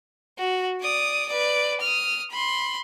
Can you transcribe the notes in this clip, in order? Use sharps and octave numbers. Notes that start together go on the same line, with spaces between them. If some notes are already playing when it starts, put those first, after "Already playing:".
F#4
D5 D#6
B4 D5
D#6 F6
B5 C6